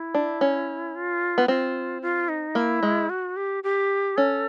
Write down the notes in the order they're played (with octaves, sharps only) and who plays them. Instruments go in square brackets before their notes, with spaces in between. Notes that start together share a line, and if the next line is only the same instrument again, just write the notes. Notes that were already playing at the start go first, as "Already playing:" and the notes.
Already playing: [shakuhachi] E4
[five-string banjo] D4
C#4
[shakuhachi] F4
[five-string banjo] B3
[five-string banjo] C4 [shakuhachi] F4
[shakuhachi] F4
D#4
[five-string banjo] A#3 [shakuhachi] E4
[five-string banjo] G#3
[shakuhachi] F#4
G4
G4
[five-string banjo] C#4 [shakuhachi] A4